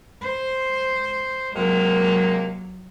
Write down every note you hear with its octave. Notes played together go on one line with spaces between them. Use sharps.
C5
C3 F#3 G#3 A#3